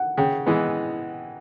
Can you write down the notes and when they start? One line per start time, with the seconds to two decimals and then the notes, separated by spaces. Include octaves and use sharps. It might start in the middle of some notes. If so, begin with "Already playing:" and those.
Already playing: F#5
0.17 C#3 G5
0.46 E3 G#3 B3